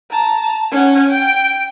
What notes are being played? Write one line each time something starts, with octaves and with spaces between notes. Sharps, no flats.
A5 A#5
C#4 F#5
G5